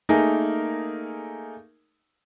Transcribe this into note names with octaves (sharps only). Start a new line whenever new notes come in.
A3 A#3 D#4 G#4 A#4